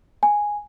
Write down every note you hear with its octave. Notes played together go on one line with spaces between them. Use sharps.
G#5